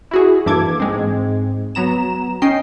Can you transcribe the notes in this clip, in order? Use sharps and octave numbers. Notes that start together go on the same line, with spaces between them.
E4 F#4 G#4
G2 E3 A#3 A4 D6 G#6
G#2 G#3 C4
F#3 B3 A#5 E7
C#4 D#5 G5 C7